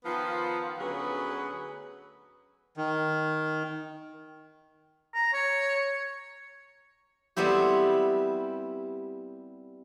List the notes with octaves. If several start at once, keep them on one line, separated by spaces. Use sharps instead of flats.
D#3 F3 B3 F4
D2 F#3 B3 C#4 G#4 B4
D#3
A#5
C#5
G3 B3 C4 E4 G4